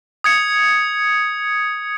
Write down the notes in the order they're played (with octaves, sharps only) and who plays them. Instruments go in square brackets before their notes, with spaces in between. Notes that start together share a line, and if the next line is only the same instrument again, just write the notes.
[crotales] D#6 G#6 C#7